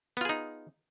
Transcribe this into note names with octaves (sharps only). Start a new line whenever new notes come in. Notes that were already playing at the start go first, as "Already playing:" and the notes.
B3 D#4 F4 G#4